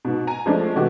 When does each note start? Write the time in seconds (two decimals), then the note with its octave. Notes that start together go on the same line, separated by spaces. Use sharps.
0.05 G#2 B2
0.27 G#5 A#5
0.46 F3 G#3 A3 D4
0.75 C3 E3 G#3 A3 F#4 G4